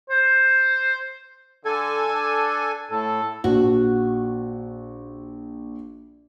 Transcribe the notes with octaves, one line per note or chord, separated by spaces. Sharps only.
C5
D3 A4 G#5
D4
A2 A4
A#1 F#4